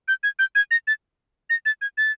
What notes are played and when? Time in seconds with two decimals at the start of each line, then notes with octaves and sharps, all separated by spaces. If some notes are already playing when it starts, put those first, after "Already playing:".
0.08 G6
0.23 G#6
0.39 G6
0.55 G#6
0.71 A#6
0.87 A6
1.50 A#6
1.66 A6
1.81 G#6
1.98 A6